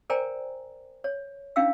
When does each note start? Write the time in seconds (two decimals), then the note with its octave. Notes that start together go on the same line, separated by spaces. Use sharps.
0.10 A#4 C5 D5 G5 G#5 A#5
1.04 C#5
1.56 C#4 D4 E4 F5 G5 E6